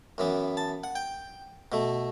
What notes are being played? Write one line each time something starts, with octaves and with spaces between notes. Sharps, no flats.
F#2 E3 B3
A5
F#5
G5
B2 A3